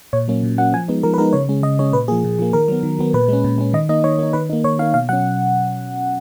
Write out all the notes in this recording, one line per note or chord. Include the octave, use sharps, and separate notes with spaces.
A#2 C#5
F#3 A#3 C#4
A#2
F#3 A#3 C#4 F#5
F3 G#5
G#3 B3 D#4
F3 A#4
B4
G#3 B3 D#4 A#4
C#3 C#5
G#3 C#4
C#3 D#5
G#3 C#4 C#5
A#2 B4
F3 A#3 G#4
A#2
F3 A#3
D#3 A#4
F#3 B3
D#3
F#3 B3
A#2 B4
G#3 C#4
A#2
G#3 C#4
D#3 D#5
A#3 D#4 D#5
D#3 C#5
A#3 D#4
D#3 B4
A#3 D#4
D#3 C#5
A#3 D#4 F5
B2 F5
F#3 C#4 F#5